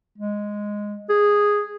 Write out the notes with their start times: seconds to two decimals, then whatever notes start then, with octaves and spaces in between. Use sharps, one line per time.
0.18 G#3
1.09 G#4